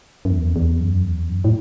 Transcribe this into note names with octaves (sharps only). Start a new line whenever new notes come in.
F#2
E2
E2
F#2
E2
F#2
A2